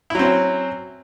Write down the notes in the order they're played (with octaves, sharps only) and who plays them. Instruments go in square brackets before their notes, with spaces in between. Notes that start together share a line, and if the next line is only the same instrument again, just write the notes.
[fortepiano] E4
F#3
C4
C#4